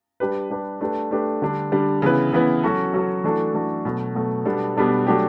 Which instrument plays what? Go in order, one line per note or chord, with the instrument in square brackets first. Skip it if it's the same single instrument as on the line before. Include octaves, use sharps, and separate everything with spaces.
[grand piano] G3 D4 G4 B4
G3 D4 G4 B4
A3 D4 G4 B4
A3 D4 G4 B4
D3 G3 D4
D3 G3 D4
C#3 E3 B3 E4 B4
C#3 E3 B3 E4 B4
F#3 C#4 F#4 A4
F#3 C#4 F#4 A4
E3 A3 D4 F#4 A4
E3 A3 D4 F#4 A4
B2 F#3 A3
B2 F#3 A3
B2 G3 B3 D4 A4
B2 G3 B3 D4 A4
F#3 A3 D4 G4